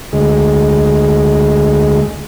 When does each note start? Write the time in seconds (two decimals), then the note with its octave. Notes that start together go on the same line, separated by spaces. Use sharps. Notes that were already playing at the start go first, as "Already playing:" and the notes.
0.13 D2 G#3